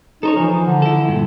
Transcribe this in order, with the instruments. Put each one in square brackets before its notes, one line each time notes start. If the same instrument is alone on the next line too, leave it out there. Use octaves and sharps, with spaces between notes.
[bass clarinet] D#4 [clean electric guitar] A4 C5 C#5
[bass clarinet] E3 [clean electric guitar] F3
[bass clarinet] D3
[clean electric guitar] E4 A4
G2 A#2